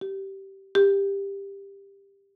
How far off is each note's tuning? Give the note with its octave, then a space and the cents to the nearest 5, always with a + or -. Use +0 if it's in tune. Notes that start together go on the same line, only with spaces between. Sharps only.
G4 -15
G4 +15